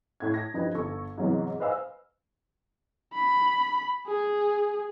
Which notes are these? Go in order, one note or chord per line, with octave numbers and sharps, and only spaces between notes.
A2 G#6
A#6
G2 F3 D#4 G4 B4
G1 A4 C#6
G#2 C3 E3 F#3 B3
B4 C5 D#5 F5 G#5 E6
B5
G#4